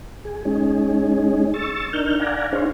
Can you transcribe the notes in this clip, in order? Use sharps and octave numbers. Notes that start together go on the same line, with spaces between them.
G#4
G#3 C#4 D#4 G#4
C#6 E6 A6
D4 D#4 A#4 F6 G6
D5 F5 F#5 G#5 A#5
D4 D#4 G#4 C5 C#5 F5